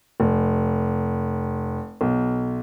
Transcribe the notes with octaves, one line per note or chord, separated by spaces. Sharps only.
F1
B1